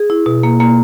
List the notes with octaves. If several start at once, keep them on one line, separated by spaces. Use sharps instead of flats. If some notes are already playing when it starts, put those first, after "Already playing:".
Already playing: G#4
E4
B2
A#3
A#3